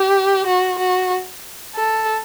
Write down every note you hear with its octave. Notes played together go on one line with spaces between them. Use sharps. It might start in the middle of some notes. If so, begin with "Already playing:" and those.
Already playing: G4
F#4
F#4
A4